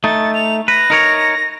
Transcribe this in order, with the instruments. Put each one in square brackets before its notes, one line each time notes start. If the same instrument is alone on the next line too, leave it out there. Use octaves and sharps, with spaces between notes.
[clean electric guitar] A3 D#4 [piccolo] A6
[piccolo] F7
[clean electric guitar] B4 [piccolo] A#6
[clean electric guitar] D#4 A#4 C#5